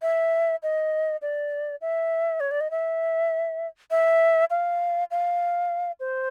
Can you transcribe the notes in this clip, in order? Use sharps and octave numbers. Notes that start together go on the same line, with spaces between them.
E5
D#5
D5
E5
C#5
D5
D#5
E5
E5
F5
F5
C5